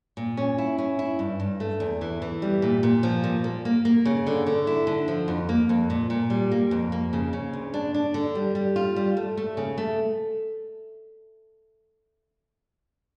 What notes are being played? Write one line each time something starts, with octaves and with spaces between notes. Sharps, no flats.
A#2
C#4
E4
C#4
E4
G2
G2
A3
E2
E3
E3
G3
A#2
A#2
F3
A#2
A#3
A#3
A#3
C#3
D3
D3
E4
D3
F3
F2
A#3
F2
A#2
A#2
G3
A#3
F2
A#3
C#3
C#3
D2
D4
D4
D3
G3
G3
F4
G3
A3
A3
C#3
A3